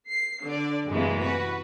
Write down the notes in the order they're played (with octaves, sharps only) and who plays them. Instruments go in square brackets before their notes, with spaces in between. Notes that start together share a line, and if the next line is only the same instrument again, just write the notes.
[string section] C7
D3 D5
F#2 A2 C3 E3 G#3 A#3
F#4 B4